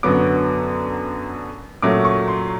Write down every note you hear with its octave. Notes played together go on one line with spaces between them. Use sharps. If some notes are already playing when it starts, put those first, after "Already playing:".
F#2 D3 F#3 B3 D6
A#2 F#3 A3 C#4 D6
C#6
C6